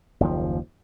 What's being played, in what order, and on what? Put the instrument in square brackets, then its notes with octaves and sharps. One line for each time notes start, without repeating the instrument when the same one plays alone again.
[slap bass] F#1 D#2 C#3 F3